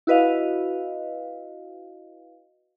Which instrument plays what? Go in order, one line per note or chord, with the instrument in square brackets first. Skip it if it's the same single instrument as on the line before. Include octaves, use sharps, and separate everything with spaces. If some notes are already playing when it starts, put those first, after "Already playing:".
[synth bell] E4 F#4 B4 D#5 F5